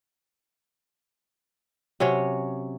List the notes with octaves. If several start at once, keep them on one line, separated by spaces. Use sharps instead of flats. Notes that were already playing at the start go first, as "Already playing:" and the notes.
C3 F#3 C#4 C#5